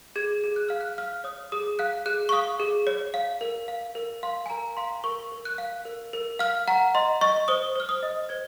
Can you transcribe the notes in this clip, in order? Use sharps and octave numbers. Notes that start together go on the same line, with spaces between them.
G#4 G#6
G#4
F#6
F5 F6
F#6
F5 F6
C#5 D#6
G#4 D#6
F5 F#6
G#4 F#6
C#6
F5 D#6
G#4
C#5
F5
A#4
F5
A#4
F5 C6
G#5
A#4 A#5
F5 C6
A#4 C#6
A#4
F#6
F5
A#4
A#4
F5 F6
F#5 A#5
D#5 C6
D#5 C#6
C5 D#6
C5 F6
D#6
D#5
C5 G#6